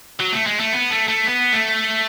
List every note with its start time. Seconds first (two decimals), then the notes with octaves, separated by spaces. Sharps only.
0.20 F#3
0.33 A3
0.47 G#3
0.60 A3
0.73 B3
0.91 A3
1.08 A3
1.26 B3
1.53 A3